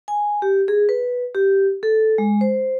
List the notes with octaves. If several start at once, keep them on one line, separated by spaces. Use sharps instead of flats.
G#5
G4
G#4
B4
G4
A4
G#3
C5